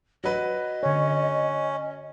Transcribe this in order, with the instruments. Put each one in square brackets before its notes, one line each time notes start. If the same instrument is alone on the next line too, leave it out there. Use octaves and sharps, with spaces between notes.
[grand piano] F#3 B4 [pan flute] D#5
[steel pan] D3 C#5 [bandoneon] C#4